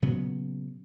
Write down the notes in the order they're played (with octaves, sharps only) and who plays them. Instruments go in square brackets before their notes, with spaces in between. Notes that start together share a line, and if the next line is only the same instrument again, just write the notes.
[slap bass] A#2 C#3 F#3 B3